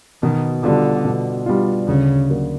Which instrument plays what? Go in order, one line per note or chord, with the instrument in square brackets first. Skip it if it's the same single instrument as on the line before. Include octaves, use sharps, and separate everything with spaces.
[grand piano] B2 [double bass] D#3
[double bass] D3 [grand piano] G3 B3 D4 F4
[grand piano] B2
G3 B3 D4 F4
[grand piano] D2 [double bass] C#3
[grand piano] D3 F#3 A#3